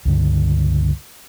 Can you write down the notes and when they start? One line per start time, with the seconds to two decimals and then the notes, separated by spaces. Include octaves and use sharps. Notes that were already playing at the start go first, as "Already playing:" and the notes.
0.05 C#2 G2 D3